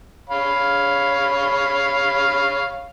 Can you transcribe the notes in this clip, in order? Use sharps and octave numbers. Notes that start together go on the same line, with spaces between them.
C#5 F5 B5